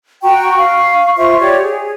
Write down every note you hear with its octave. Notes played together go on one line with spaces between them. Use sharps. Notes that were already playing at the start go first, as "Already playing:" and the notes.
F#4 G5 A#5 C#6
F5 C#6
F4 C5 E5 C#6
G4 C#5 D5
G#4